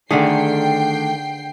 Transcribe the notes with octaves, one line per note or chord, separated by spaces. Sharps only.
D3 D#3 A3 D4 G#4 G5 C7